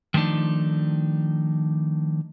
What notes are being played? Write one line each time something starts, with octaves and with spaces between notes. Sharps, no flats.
D#3 F3 A3 D4 D#4